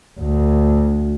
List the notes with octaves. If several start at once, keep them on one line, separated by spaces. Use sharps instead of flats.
D2